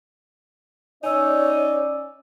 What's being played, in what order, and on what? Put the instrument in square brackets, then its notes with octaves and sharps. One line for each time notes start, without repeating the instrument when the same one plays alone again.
[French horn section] C#4 D5 [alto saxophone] D#4 [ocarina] C#5 [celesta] G#5 E6